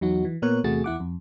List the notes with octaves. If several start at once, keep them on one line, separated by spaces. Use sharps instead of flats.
E2 F#3 D#4 F#4
E3
A#2 B3 A#4 C#5 F#6
E2 C3 A3 F#4 G#4 A6
E2 E4 F#5 D6
F2